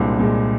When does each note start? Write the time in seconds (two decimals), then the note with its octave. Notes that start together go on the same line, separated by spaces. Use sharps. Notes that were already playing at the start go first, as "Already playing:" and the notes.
Already playing: C2 A#2 G#3 D4 C5
0.19 A#2 G#3